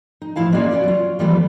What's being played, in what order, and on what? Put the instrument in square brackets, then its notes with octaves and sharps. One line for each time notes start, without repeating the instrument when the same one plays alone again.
[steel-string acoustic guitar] D#4
A2 F3 E4 F5 A5
G#3 A#3 C#4 F#4 D5 F5
B3 C#4 F#4 G#4 D5
F#3 F4
E3 F3 G3 A3 B3 F4